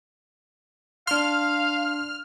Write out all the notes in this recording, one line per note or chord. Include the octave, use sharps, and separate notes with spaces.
D4 F5 C6 F6